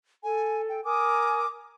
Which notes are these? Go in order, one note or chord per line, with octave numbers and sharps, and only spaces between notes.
A4 G#5
G5
A#4 G#5 D6 D#6